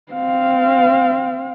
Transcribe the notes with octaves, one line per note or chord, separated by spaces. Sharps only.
C4 F5